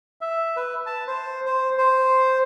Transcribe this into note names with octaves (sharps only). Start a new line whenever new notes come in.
E5
B4
A5
C5
C5
C5